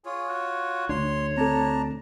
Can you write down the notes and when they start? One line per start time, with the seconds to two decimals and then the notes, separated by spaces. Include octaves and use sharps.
0.05 F4 G#4 C#5
0.28 F#4
0.89 D2 D4 C#5 C6
1.37 C4 D4 A4 A5 A#5